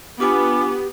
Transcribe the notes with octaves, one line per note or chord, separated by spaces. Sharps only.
B3 D4 F4 G4 G#5 D6